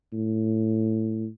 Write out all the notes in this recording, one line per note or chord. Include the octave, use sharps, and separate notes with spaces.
A2